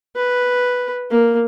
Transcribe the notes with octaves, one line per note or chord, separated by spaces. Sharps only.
B4
A#3